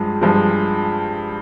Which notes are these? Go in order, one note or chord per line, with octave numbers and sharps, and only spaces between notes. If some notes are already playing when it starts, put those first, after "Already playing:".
Already playing: G2 F3 G#3
G2 F3 G#3